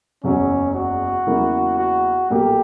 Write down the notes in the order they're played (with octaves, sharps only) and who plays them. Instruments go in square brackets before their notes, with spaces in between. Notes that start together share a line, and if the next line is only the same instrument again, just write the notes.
[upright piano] F#1 E2 C#3 F#3 [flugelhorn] C#4
[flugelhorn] F#4
[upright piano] E2 C#3 F#3 A#3 E4
[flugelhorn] F#4
[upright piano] B1 A#2 A#3 [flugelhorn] G4